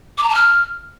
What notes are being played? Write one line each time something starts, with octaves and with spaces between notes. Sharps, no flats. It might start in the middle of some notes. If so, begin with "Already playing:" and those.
D6
A#5
A5
F6